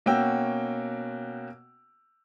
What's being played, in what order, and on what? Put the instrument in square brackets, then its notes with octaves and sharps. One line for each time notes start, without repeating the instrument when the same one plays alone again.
[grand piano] B2 A#3 C#4 F#4 G5 E6